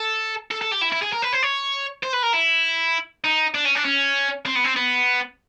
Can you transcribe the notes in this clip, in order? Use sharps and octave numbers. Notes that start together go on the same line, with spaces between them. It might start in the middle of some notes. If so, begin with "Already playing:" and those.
Already playing: A4
A4
A4
G4
E4
E4
G#4
A#4
B4
C5
C#5
C5
B4
A#4
E4
D#4
D4
C#4
D4
C#4
C4
B3
C4
B3